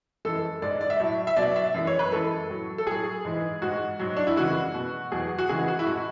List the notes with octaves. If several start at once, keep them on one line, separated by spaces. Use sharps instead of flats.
F#2 E3 G#3 A4
G#2 G#3 D5
D5
E5
A2 F#3
E5
B2 F#3 D5
E5
F#2 E3 G#3
C#5
B4
F#2 E3 G#3 A4
A2 F#3
A4
A2 F#3 G#4
G#2 E3 G#3
G#2 G#3 F#4
G#2 F#3
D4
E4
F#2 C#3 E3 G#3 F#4
B2 G#3
E2 B2 F#3 G#4
F#4
F#2 C#3 E3 G#3 G#4
F#4
E4
A2 G#3 F#4